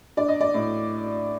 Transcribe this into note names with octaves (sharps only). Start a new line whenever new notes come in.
D4 D5
D#5
D5
A2